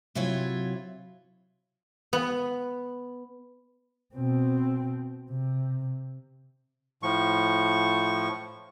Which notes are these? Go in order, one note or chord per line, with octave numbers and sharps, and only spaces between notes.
C3 F#3 E4 F4 C#5
B3
B2 C4
C3
A2 F3 C#6